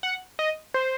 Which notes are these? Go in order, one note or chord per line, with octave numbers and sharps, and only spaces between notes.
F#5
D#5
C5